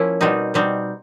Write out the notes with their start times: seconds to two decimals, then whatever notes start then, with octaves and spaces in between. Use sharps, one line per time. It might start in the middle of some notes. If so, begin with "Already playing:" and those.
Already playing: F3 A#3 C#4 E4
0.21 B2 G3 C4 D#4
0.54 B2 G3 C4 D#4